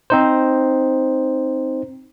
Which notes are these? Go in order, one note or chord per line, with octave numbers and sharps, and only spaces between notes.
C4 D#4 C5